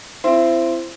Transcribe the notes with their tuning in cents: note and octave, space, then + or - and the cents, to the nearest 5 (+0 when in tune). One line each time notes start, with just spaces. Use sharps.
C4 +0 E4 +35 C6 +0